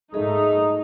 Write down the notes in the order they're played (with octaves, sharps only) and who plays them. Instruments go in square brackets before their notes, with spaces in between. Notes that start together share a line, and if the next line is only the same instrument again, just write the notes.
[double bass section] G#2 A3 [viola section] D#4 [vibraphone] G#4 D#5